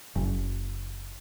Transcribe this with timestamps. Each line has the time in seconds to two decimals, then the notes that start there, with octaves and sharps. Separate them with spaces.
0.15 F#1